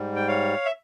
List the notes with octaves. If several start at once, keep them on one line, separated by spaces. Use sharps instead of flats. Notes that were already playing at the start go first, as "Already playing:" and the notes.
Already playing: G#2 G3
G5
C#5 F5
E5